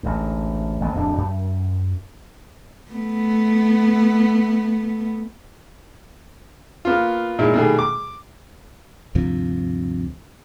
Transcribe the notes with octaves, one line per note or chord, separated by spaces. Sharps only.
A1 D2 G#2
A1 D#3 A#3 B3
D1 F2 A2 D4
F#2
A3 B3
A#3 B3 F4
A#2 G#3 D#4 E4
B2 D#3 G3 A3 G#4
D6
D2 G2 C3 F3